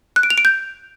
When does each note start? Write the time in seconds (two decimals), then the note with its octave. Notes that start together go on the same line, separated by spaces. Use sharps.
0.16 F#6
0.23 D7
0.30 F7
0.38 D7
0.45 G6